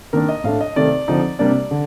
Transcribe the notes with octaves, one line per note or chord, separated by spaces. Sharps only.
D#3 A#3 D4 A#4
D#5
A2 A3 D4 F5
D#5
C3 D#3 A3 C4 D5
D3 F3 C4 D#4
C3 G3 A#3 D4 D5
D3